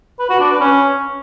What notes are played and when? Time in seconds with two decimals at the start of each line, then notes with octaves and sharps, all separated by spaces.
0.19 B4
0.30 F#4
0.40 D4
0.50 B4
0.61 C#4